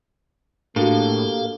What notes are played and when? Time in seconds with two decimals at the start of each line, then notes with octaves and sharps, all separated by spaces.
0.76 A2 A#3 D4 F#4 G4 A4 F5